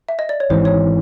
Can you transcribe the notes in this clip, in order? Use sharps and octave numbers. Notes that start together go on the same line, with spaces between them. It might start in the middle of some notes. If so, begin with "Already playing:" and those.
E5
D#5
D5
C#5
G#1 G#2 E3 C5
C#5